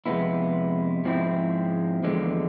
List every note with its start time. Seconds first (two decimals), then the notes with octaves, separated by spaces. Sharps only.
0.06 F2 C3 G#3 B3 E4
1.05 G#2 F3 G#3 C4 E4
2.03 E2 D3 F3 G#3